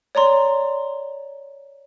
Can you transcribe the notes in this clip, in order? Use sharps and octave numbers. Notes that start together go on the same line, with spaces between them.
C#5 D5 A#5 C6